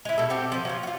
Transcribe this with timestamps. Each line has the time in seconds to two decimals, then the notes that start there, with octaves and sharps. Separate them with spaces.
0.05 G#3 E4
0.18 B2 A4
0.30 C4 F#4 G4 A4
0.52 F3 C5
0.65 F#3 A#3 F4
0.83 F4 F#4